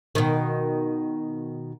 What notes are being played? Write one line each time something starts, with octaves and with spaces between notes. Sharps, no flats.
B2 D#3